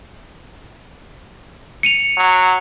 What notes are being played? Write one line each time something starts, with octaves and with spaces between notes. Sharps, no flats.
C#7 D#7 F7
F#3